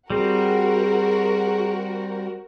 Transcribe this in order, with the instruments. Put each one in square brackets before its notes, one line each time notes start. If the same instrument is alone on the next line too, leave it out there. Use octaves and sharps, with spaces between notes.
[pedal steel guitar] G3 C4 [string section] F#4 A#4 [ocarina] G#4